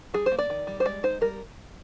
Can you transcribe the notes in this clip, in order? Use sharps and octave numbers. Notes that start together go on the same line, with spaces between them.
G3 G#4
C5
A#3
D5
D#3
G3
C5
G#3 D5
D#4 C5
G3 A#4